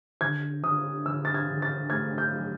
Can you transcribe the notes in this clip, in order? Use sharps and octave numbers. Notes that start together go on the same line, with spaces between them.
D3 G#6
D3 D#6
D3 E6
A6
G#6
D3
A6
A3 G#6
G6
F#3